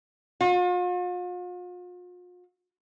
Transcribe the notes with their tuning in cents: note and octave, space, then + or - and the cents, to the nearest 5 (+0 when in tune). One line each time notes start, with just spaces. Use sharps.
F4 +45